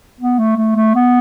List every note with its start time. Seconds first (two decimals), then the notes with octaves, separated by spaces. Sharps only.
0.21 B3
0.39 A3
0.57 A3
0.76 A3
0.95 B3